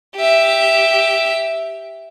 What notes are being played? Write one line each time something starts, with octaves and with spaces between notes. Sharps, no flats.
G4 E5